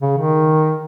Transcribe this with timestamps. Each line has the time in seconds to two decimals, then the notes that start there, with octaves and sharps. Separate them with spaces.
0.02 C#3
0.18 D#3